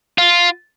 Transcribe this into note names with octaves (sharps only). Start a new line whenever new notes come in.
F4